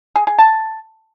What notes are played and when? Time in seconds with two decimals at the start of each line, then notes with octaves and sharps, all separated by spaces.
0.16 G#4
0.27 G#4
0.39 A5